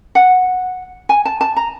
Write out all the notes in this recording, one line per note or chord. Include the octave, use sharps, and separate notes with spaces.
F#5
G#5
A5
A5
A#5